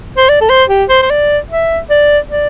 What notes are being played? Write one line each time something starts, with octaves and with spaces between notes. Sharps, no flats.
C5
D5
A4
C5
G4
C5
C5
D5
E5
D5
D5